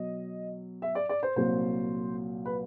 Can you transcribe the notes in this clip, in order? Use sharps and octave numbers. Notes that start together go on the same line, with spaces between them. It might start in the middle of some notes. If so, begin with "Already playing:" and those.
Already playing: B2 F#3 D#5
E5
D5
D5
C5
C2 A#2 F#3 C5
B4